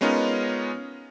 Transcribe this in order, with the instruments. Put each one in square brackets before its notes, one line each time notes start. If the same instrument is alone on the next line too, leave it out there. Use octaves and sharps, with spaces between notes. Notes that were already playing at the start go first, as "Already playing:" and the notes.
[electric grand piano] G#3 B3 C#4 D#4 F4 A#4